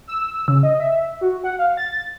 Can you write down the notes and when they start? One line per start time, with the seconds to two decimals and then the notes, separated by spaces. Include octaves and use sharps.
0.08 E6
0.48 C#3
0.63 D#5
0.80 E5
1.21 F#4
1.44 F#5
1.59 F5
1.77 A6